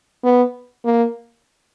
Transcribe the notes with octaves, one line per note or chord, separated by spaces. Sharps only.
B3
A#3